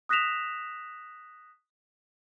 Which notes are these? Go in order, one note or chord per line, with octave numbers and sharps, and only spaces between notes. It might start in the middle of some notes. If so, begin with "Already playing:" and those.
D#6 F#6 A#6 B6 E7 F7